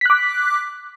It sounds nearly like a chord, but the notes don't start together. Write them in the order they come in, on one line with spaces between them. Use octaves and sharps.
B6 F#6 D6